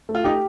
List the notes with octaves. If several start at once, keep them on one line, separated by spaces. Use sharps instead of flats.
A3
F4
D#4 G4